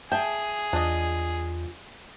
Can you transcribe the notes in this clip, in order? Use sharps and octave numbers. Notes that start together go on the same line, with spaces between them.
G#4 E5 G5 A5
E2 D4 F4 D#5